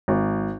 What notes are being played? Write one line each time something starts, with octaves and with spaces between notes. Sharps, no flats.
G#1